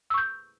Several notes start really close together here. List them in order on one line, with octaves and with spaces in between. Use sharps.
E6 C#6 G6